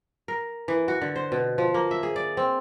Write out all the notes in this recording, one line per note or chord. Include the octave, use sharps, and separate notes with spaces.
A#4
E3
F#4
D3
C5
B2
F3
A#3
E5
G#4
D5
C4